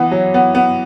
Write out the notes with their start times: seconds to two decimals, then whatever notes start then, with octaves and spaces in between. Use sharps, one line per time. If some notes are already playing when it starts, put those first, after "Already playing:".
Already playing: E3 B3
0.11 F#3
0.34 B3
0.55 B3